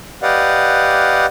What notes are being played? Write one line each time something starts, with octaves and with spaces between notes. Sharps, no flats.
G4 B4 D5 D#5 F5 F#5